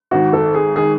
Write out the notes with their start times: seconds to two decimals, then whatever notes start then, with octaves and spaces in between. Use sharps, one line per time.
0.11 G#1 G#2 D#3 F#4
0.33 A4
0.54 G#4
0.76 D#3 G#4